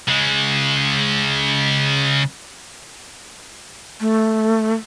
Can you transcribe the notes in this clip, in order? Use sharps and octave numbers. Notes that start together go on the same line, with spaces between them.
C#3 G#3
A3